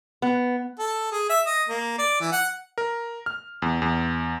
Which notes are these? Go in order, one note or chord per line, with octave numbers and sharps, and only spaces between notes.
B3
A4
G#4
E5
D#5
A#3
D5
E3
F#5
A#4
F6
E2
E2